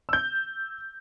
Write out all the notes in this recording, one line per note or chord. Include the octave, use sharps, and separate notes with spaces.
E6 G6